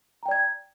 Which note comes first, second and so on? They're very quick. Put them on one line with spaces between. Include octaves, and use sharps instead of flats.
A#5 G5 D5 G#6